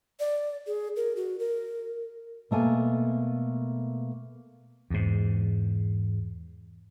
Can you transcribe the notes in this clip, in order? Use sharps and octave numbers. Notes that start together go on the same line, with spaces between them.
D5
G#4
A#4
F#4
A#4
B2 A3 A#3 G#5
E2 G#2